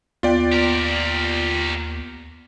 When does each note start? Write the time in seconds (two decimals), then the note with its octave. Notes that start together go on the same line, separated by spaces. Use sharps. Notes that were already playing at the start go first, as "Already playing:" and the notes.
0.23 D#2 B3 F4 D5 G5
0.52 G4 A#4